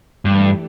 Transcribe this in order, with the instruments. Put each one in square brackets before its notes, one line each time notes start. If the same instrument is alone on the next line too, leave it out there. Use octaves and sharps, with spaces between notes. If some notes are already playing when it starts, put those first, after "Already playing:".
[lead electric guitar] G2 [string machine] E3 A3 D4 G4